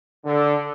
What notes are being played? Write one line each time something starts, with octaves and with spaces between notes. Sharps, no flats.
D3